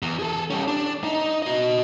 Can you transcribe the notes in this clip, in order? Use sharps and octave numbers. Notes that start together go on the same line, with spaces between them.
E2
G#4 A4
G3 C#4
D4
D#4
F#4 D#5